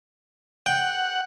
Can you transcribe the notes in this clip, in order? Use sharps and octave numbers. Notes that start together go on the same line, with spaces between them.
F#5 G5